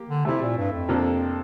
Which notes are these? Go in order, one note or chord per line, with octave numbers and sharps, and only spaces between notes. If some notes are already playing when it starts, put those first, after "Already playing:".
Already playing: A#3 G4
D3
C3 A3 C4 E4
A#2
G2
F2
C3 F3 A#3 D4 A4